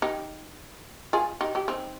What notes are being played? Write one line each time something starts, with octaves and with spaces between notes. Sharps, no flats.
D#4 G4
F4 G#4
D#4 G4
D#4 G4
C4 D#4